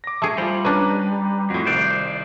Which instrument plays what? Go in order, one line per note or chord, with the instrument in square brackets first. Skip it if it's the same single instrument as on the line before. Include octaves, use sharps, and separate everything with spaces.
[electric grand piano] D6 A#6
[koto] A3 G#4
[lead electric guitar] G3 [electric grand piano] F4 C5
[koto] C#4 D4 [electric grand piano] B4 A#5 D#7
[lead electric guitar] F2 [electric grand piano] A2 F#4
[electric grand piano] C2 D#3 F#6 [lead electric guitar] C5 D5